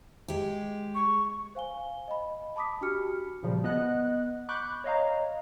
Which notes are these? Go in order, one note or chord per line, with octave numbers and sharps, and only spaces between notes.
G#3 G4
C#6
C5 F5 G#5 G7
D#5 B5
A5 B5 D6 D#6 B6
D4 F#4 G4 B5 F6 C#7
A#2 C#3 F3 G3
B3 D#5 F#5 F#6
B5 C#6 D6 F#6 G6
C#5 D#5 F5 A#5